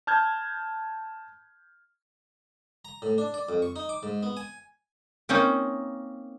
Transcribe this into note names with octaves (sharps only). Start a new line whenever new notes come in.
A5 F6 G6 G#6
A#5
A2
D4
D5
F2
C#6
D#4
D6
G#2
B3
G#5
A#3 C4 C#4 D#4